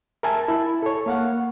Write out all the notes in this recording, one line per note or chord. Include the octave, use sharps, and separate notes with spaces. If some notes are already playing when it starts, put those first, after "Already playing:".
A#4 E5 G#5 A5
E4
A4 C#5
A#3 F5 F#5